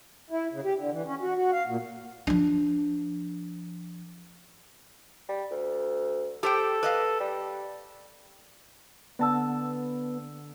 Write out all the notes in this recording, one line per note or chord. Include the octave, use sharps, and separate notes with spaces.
E4
C#3
G4
D3
E3
C#4
F#4
F#4
F5
A#2
F3 D4
G3
D2
G4 A4 C5 G5
B4 D#5 F5
G3
D3 B3 A5 E6